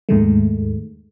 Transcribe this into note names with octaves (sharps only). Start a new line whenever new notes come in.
D#2 G#2 D#3 G#3 A3